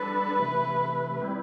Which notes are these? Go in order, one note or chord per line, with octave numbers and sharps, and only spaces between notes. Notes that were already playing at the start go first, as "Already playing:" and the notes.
Already playing: G3 D4 A4 B4
C3 E3 A3
G3 C4 E4